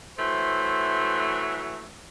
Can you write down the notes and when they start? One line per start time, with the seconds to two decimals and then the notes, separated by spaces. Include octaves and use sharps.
0.18 E3 F#3 A3 C5